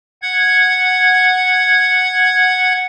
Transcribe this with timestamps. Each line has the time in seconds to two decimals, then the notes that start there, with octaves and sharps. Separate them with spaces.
0.22 F#5 G#6